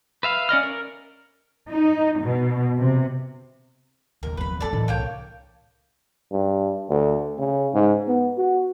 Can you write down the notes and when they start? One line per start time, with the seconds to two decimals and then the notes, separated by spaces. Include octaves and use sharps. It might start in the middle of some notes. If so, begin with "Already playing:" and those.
0.23 B4 E5 F5
0.49 C#4 D5 D#5 F6
0.63 A#4
1.68 D#4
2.21 B2
2.78 C3
4.23 F#1 D#2 A#4
4.37 F3 C4 B4 B5
4.60 G2 F#3 A4 D5
4.73 A2 E3 D4
4.88 C2 A#3 C#5 G5
6.32 G2
6.89 D2
7.39 C#3
7.74 G#2
8.08 B3
8.38 F#4